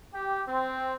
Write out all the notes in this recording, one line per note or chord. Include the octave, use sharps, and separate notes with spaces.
G4
C4